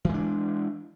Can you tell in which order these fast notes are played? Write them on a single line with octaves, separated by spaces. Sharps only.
E3 G#3 D4